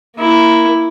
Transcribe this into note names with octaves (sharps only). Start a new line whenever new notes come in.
A#3 E4